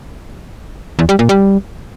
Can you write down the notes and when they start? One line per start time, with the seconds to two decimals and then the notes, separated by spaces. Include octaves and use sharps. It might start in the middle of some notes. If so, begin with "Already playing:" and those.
0.99 E2
1.09 G3
1.19 A#2
1.29 G3